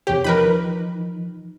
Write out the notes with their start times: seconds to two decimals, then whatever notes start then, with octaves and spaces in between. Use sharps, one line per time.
0.07 E2 C3 G4 C#5
0.24 E3 F3 D#4 A#4 B4 B5